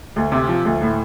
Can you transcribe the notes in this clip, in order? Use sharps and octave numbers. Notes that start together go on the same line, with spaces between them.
D2
C3
F3
D2
A2